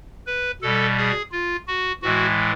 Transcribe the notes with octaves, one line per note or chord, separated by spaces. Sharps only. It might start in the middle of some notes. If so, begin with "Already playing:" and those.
B4
B2 G3 A4
G#4
F4
F#4
A2 E3 G#3 F#4